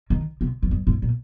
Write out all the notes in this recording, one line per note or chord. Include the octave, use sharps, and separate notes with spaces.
D#3
C3
F2
G2
G#2
A#2